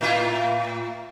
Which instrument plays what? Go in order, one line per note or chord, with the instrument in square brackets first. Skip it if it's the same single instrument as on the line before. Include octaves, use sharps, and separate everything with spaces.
[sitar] A2 E4 F4